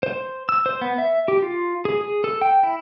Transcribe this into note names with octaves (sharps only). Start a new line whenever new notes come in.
C5
E6
C5
B3
E5
G4
F4
G#4
G#4
A4
G5
E4